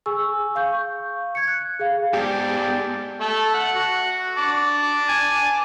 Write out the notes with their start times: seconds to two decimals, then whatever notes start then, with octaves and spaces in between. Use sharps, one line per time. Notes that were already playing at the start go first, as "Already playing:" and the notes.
0.06 G#4 G#5 C#6 E6
0.55 F5 C#6 G6
1.35 G#6 C#7
1.48 F#6
1.80 G#4 F5
2.13 G#2 B3 G4 D5 G5 A5
3.21 A3 A4
3.54 F#5
3.74 F#4
4.38 A5 D6
5.08 G#5